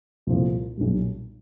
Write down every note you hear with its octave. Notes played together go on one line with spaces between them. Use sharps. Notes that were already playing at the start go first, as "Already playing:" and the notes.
C2 A#2 F3 A3
B1 A#2 G3